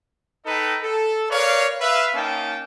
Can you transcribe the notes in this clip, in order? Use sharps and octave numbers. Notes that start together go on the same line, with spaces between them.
D#4 A4 B4 D#5 G5 A#5
A4
A#4 B4 C#5 D5 F5
B4 E5 F5
A#3 C#4 D#4 F5 G5 A5